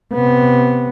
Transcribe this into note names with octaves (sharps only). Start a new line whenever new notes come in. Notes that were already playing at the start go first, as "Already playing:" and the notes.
C3 B3